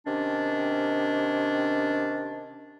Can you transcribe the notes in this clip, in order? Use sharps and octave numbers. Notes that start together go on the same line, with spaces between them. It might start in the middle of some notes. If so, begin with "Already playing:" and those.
C3 D#3 C#4 D4